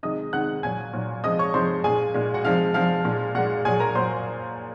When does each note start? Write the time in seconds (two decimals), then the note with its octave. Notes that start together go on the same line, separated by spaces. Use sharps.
0.03 C3 D#3 G#3 D#5 D#6
0.33 C3 D#3 G#3 F#5 F#6
0.63 A#2 F#3 G#5 G#6
0.93 A#2 F#3
1.24 C3 F3 G#3 D#5 D#6
1.39 C#5 C#6
1.54 C3 F3 G#3 C5 C6
1.84 A#2 G#3 G#4 G#5
2.14 A#2 G#3
2.34 F#4 F#5
2.45 C3 F3 G#3 F5
2.74 C3 F3 G#3 F5
3.05 A#2 G#3
3.35 A#2 G#3 F#4 F#5
3.65 A#2 F#3 G#4 G#5
3.80 A#4 A#5
3.95 A#2 F#3 C5 C6